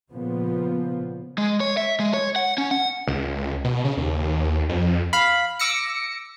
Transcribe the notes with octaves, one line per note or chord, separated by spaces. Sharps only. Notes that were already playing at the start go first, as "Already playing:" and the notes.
A#2 C#3 F3 B3
G#3
C#5
E5
G#3
C#5
F#5
C#4
F#5
C#2
B2
C#3
D#2
F2
F5 B5
D6 E6 A#6 C#7